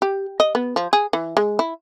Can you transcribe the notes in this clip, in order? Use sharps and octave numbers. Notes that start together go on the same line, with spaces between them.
G4
D#5
B3
F3
G#4
E3
G#3
E4